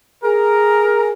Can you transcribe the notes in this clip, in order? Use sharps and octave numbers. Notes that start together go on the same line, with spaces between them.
G#4 A#4